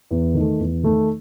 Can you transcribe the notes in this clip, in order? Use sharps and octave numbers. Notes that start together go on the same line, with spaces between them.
E2
D#3
A3
E2
D#3 A3